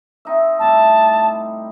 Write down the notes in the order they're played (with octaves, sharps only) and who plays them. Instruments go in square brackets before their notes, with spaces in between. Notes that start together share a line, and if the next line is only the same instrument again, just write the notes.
[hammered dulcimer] C4 D#4 E5
[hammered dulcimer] A2 G3 C4 [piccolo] A5